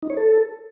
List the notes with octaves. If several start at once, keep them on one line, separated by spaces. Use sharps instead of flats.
D#4
C#5
A4